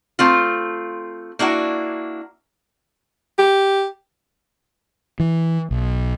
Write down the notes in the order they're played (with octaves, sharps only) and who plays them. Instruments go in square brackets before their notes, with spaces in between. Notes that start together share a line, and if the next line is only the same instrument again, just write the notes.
[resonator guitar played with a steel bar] A3 C4 F4
A#3 D4 E4 F#4
[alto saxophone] G4
[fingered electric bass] E3
B1